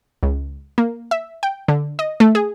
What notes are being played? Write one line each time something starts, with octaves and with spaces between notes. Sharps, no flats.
C#2
A#3
E5
G5
D3
D#5
A3
G#4